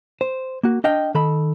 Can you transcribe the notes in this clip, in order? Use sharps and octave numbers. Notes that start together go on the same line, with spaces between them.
C5
A#3 F#4
D4 D#5 F5 G5
D#3 A4 B5